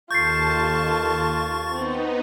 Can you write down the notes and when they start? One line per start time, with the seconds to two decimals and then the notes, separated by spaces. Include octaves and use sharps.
0.11 D#2 F4 A4 A5 C#6 G6 A6 C7
1.72 B3 C4 D#4